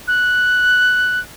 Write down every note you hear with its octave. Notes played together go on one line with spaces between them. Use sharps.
F#6